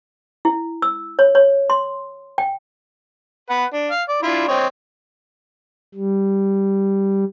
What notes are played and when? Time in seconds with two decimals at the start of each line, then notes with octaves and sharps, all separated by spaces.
0.45 E4
0.82 E6
1.19 C#5
1.35 C#5
1.70 C6
2.38 G5
3.50 B4 F#5
3.73 D4
3.91 F5
4.09 D5
4.22 D4 E4 F4
4.48 C4 C#5 D#5
5.95 G3